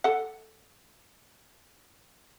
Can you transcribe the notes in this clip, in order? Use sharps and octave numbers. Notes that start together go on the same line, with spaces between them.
A4 F#5